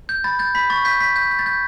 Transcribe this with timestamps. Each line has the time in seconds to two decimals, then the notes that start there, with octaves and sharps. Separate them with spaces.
0.09 G6
0.24 B5 A6
0.39 G6 A6
0.55 B5 B6
0.70 C#6 A6
0.85 G6 B6
1.00 G6 B6
1.16 G6
1.31 G6
1.39 A6
1.46 G6